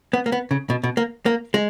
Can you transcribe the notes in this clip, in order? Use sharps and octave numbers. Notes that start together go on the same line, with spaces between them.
B3
A#3
B3
C#3
B2
B2
A#3
A#3
G#3